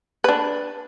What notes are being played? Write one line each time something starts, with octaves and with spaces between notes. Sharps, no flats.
D4 B4